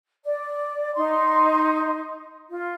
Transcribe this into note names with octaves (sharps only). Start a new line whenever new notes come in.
D5
D#4 C6
F4